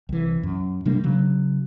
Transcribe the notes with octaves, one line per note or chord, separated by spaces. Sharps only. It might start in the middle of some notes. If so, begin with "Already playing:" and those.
C2 E3
F#2
C3 G3 A#3 D4
C#3 F#3